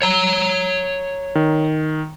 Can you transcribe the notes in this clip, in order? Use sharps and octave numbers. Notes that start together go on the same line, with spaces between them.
C#5 A#5
D#3